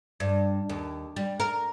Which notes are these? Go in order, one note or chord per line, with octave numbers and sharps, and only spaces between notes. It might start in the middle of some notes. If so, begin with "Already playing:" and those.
G2
D#2
G3
A#4